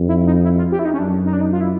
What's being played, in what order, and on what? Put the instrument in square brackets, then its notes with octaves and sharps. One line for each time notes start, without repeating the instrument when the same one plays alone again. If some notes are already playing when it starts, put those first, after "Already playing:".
Already playing: [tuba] F2
[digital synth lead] E4
D#4
E4
F4
G4
E4
D#4
C#4
[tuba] F#2 [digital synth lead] D4
[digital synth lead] D#4
D4
D#4
F4
E4